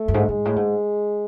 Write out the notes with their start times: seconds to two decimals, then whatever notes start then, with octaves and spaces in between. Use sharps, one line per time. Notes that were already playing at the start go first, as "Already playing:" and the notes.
Already playing: A3
0.08 F#2
0.14 G#2
0.28 G#2 G#3
0.45 A2
0.56 G#2